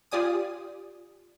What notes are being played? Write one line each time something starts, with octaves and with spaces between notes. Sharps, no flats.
F4 G4 D5 G#5 D#6